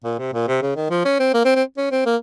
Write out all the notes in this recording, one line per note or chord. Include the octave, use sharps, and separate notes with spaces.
A#2
C3
A#2
C3
C#3
D#3
F3
C#4
C4
A#3
C4
C4
C#4
C4
A#3